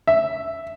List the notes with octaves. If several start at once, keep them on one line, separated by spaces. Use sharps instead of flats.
E5